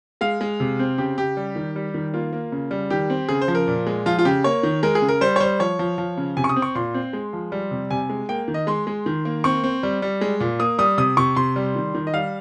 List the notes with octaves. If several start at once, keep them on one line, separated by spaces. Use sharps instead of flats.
G#3 F5
G#3
C3
C4
C#3 G4
C#3 G4
G3
D#3
G3
D#3
A#3 F4
A#3
C#3
G3
D#3 G4
C4
C#3 G#4
C5
F3
A#4
A#2
G#3
F3 F4
F4
C#3 G4
A#3 C#5
D#3
G#3 A#4
G#4
C#3
A#4
G3 C5
C#5
G3 C5
F3 C#5
F3
F3
C#3
C3 G#5
C#6
D#6
C4
C#6
A#2 C6
C4
G#3
F3
G3
C3
C3 G#5
G#3
A#3 G5
D#3
D#5
G#3 C6
G#3
D#3
A#3
C4 C#6
C4
G3
G3
G#3
A#2
A#3 D#6
G3 D#6
C3 D#6
C3 C#6
C3 C6
G3
D#3
D#3
D#5
G3 F5